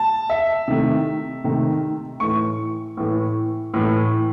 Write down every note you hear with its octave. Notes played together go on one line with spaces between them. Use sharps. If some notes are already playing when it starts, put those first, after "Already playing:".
Already playing: A5
E5
C3 D#3 A3
C3 D#3 A3
A2 E3 A3 C#6
A2 E3 A3
A2 E3 A3